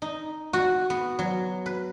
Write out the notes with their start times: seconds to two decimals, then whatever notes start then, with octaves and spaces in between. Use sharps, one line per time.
0.02 D#4
0.53 F#4
0.90 B3
1.19 F#3
1.66 B4